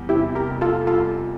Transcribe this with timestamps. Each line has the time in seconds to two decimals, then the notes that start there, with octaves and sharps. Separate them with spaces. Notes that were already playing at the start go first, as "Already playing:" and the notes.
Already playing: E2 G3
0.09 C3 E4 G4
0.35 G4 A#4
0.48 F1
0.61 F4 A4
0.87 G3 F4 A4